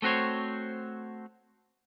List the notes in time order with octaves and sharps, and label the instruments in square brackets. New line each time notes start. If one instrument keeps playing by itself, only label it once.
[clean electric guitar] A3 C4 F#4 C5 C#5